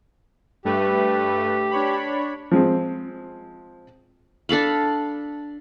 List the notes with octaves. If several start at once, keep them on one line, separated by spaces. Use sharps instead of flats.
G2 A3 G4 B4
D4 C#5 B5
F3 G#3 C4
D4 A4 F5 B5